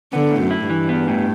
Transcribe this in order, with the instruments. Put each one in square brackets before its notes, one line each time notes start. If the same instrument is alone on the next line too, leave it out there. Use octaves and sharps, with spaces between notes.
[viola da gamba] D3 [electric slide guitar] B3
[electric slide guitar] A2
[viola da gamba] F#2
[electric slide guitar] E4
[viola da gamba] G2 [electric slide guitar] E3
[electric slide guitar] B3
A2